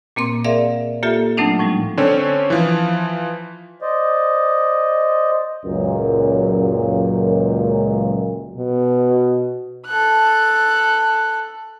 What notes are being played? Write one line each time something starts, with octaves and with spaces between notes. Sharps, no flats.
A#2 A#3 C4 C6
G#4 A#4 D5 E5 F5
A#3 F4 G4 A4 E5
F#3 A3 C4 D4 D#4
A2 F3 G3
D3 C4 C#4 C#5
E3 F3
C5 D5 D#5
C#2 F#2 A#2
B2
A4 F#6